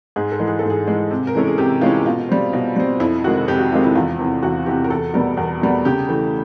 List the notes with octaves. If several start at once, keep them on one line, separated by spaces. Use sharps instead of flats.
G#2 G#4
A4
E3 G#3
G#4
G#2 A4
G#4
E3 G#3
C3
A#4
E3 G#3 C#4 A4
G#4
C3 G4
E3 G#3 C#4 F4
B2 F4
G3 C4
B2
G3 C4
F2 E4
C3 D#3 G#3 F#4
F2 G4
F#4
C3 D#3 G#3 F4
E4
E2 F4
C3 E3
E2 F#4
C3 E3 G4
A#4
E2 A4
B2 G3 B3 A#4
E2 A#4
B2 G3 B3
C#3 G4
E3 A3